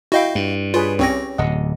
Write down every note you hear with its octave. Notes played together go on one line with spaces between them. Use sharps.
E4 F#4 D#5 F5 G5
G2
F4 G#4 B4 C#5
C2 C4 C#4 G4 C#5 A#6
D1 D#5 F#5